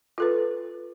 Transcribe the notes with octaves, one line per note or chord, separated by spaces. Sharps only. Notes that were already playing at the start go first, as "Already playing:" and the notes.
F4 A4 B4